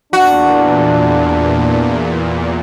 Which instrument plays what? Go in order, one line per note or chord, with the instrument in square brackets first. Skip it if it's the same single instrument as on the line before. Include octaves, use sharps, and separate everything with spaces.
[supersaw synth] E2 A#2 [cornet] D4 [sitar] F#4